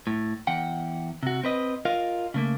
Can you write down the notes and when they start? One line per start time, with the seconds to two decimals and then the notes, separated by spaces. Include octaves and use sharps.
0.07 A2
0.47 E2 F#5 G5
1.23 C3 F#4
1.43 C4 B4 D#5
1.85 F4 A#4 D#5 F5
2.34 C#3 A3 A#3